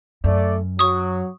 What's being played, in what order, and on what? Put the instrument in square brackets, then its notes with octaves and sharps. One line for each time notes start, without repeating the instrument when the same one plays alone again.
[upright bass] F#2 [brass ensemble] A3 D5
[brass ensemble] F#3 [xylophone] C#6 D#6